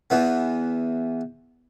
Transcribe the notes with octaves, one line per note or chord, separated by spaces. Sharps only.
E2 E3 B3